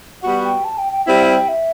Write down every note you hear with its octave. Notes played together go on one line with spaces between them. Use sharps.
G3 B3 F#4 F#5
G5
A5
G5
G5
G3 C4 E4 G5
F#5
G5
E5